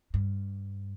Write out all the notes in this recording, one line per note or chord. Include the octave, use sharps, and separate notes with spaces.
G2